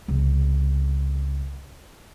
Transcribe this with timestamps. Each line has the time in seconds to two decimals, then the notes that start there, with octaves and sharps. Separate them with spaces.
0.08 C#2 C3